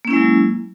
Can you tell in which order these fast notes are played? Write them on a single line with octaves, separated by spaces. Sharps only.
A#3 C#4 E4 G#3 F#3